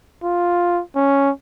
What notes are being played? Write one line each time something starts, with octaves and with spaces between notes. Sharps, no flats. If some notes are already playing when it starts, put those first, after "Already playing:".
F4
C#4